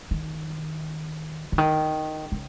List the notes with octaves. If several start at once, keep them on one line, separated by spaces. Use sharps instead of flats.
D#3
D3
D#3
C#3